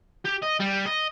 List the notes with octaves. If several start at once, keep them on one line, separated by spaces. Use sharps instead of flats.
G4
D#5
G3
D#5